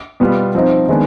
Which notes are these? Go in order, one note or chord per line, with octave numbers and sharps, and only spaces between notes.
B2 G3 B3 F4
F3 C4 D#4
D#3 G#3 B3 D4